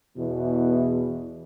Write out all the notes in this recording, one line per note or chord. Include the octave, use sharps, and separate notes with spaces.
E2 B2 E3